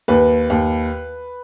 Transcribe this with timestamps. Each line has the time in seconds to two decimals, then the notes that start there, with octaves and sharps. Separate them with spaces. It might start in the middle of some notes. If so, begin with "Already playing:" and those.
0.08 D#2 B4
0.50 D#2